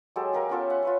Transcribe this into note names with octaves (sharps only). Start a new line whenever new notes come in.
F#3 G#3 G4 A4
G4 A#4 F5 G#5
B3 C#4 F4 A4
E5 F#5 C6
F4 B4 C#5